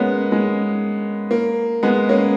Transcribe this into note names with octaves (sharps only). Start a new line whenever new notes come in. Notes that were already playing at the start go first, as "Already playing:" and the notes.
Already playing: G#3 A#3 B3 C#4
G#3
A#3
G#3 B3
A#3 C#4